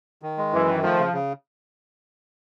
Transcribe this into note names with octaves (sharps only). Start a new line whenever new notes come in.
D#3
G#3
F#2 E3
D#3
F3 A3
C#3
C#3